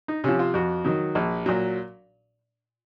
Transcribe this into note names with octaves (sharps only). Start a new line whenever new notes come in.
D#4
C3 F3 C#4
F4
F2 F#4
D#3 F#3
A#1
A#2 F#3